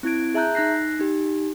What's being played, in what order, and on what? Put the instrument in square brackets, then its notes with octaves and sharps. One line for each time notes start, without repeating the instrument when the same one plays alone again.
[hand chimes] C4 E4 G#6 D7
G#4 E5 A5 A#5 F#6 G6
D#4 F#6 A#6 C7
D#4 G4